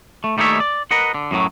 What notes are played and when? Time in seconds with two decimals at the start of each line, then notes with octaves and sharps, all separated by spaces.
0.24 A3
0.37 D#2 G3 A3 D#4 C#5 E5
0.60 D5
0.91 A#4 B4 D#5 F#5
1.14 D3
1.31 F#2 A2 D#3 F#3